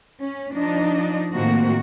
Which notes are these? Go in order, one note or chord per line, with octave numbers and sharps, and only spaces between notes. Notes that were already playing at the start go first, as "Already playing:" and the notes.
C#4
F3 D4 D#4 D#5
A2 D#3 F3 A#3 C4 F#4